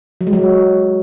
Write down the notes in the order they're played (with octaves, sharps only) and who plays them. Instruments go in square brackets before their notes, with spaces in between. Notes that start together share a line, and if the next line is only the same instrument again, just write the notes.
[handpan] F#3
G#3
F#3